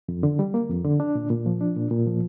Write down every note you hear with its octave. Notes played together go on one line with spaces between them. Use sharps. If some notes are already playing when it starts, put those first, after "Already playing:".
F2
D3
G3
A#3
F2
D3
D4
A#2
A#2
F3
D4
A#2
A#2
F3